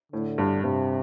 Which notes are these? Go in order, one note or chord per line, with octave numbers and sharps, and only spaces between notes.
A2 D3
G2
G2 C3